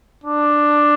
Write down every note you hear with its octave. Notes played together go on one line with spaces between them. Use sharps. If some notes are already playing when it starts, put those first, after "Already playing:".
D4